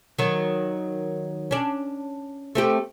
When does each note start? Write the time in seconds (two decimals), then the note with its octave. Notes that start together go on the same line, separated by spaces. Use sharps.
0.18 D#3 F#3
1.51 C#4 D4
2.55 A3 C4 G4